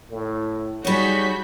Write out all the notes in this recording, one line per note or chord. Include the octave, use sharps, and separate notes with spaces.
A2
G3 D#4 F#4 G#4 C#5 G6 B6